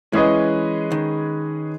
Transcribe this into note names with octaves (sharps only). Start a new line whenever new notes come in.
E3 G#3 C#4 G#4 B4 D#5
D#3